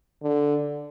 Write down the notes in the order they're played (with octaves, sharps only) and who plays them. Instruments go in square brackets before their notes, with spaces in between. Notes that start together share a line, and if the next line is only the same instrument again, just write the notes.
[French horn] D3